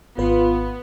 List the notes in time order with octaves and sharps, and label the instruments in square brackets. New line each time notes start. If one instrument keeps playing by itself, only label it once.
[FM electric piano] G#1 B4 [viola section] B3 [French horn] F4